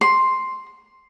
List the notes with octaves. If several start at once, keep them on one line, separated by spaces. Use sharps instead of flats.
C6